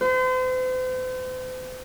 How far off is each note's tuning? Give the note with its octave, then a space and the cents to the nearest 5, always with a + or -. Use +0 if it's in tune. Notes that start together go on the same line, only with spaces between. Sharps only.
C5 -40